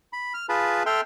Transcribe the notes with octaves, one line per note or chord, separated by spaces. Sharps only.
B5
F6
F4 G#4 B4 A5 B5
A4 E5 G5 C6 F6